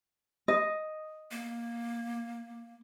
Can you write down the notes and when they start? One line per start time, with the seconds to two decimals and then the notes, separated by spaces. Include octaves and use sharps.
0.48 D#5
1.31 A#3